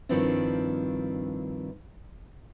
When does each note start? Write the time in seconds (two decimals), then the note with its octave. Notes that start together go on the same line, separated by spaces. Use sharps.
0.09 G2 D#3 F3 C4 D4 E4